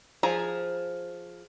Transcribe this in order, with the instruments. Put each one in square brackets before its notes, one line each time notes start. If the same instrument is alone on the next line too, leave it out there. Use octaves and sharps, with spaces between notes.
[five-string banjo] F3 G#4 A#5